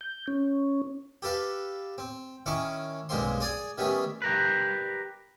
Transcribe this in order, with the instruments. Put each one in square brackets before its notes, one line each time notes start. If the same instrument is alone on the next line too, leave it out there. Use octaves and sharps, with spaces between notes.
[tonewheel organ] G6
C#4
[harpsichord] G4 A4 B4 F5
C4
D#3 C#4 E4 C#6 D6
B1 G2 G#3 A#3 C4 C6
G#4 D5 G#5
D#3 G3 A3 B3 C#4
[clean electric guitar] G4 A#4 B4